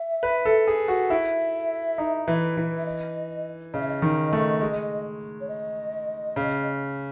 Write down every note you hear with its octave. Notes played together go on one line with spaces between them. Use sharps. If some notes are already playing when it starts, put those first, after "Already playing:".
Already playing: E5
B4
A4
G#4
F#4
E4 E5
D#4
E3
E3
E5
D#5
C#3 D#5
E5
D#5
D#3
A3
G#3
C#5
D#5
C#3